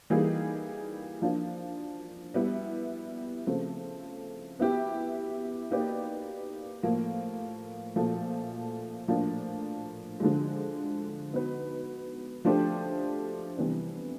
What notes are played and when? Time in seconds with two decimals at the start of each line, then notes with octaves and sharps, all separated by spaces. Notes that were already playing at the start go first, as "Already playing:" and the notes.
0.10 E3 G3 A#3 D#4 G#4
1.22 F3 A#3 D4 F4
2.34 G3 B3 E4
3.47 C#3 F3 A3 C4
4.59 B3 E4 G4
5.71 A#3 D#4 G4 B4 D5
6.83 A2 F3 A#3
7.96 A#2 F3 A3
9.08 A2 F3 A#3 D4
10.20 D3 F3 G#3
11.33 B3 D#4 F#4 B4
12.45 F3 A3 D4 G4 C5
13.57 C3 E3 G3 B3 D4